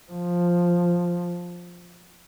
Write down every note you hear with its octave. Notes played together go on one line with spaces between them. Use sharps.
F3